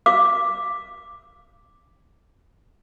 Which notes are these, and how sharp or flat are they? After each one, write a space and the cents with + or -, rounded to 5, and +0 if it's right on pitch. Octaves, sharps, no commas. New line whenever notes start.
F5 +0 D6 +0